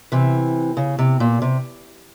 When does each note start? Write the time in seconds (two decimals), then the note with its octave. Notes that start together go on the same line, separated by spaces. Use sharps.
0.12 C3 E3
0.77 C#3
0.99 C3
1.20 A#2
1.42 C3